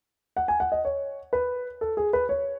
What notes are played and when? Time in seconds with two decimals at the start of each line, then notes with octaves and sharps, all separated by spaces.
0.37 F#5
0.48 G#5
0.60 F#5
0.72 D#5
0.85 C#5
1.33 B4
1.81 A4
1.97 G#4
2.13 B4
2.29 C#5